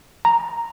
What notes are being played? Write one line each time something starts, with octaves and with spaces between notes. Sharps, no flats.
A#5